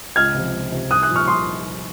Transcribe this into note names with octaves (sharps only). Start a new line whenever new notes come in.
C#2 F6 G#6
C3 F3
C#2
C3 F3
C2 D#6 F#6
D#6 F#6
A#2 F3
C#6 F6
C2 C6 D#6